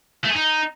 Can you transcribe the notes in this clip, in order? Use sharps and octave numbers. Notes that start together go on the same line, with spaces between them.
A3
G#4
D#4